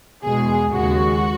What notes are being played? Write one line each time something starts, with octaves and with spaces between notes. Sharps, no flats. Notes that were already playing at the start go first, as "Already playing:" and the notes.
E2 B2 G#3 G#4
D#2 C#3 G#3 F#4